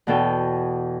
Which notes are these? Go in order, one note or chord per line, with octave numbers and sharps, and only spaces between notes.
E2 B2 A4 G5